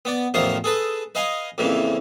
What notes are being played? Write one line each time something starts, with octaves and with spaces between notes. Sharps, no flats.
B3 D5
A1 E2 D#3 F3 F5 D#6
G#4 A4 B4 A5
B4 D#5 F5 G#5
F2 A#2 C#3 E3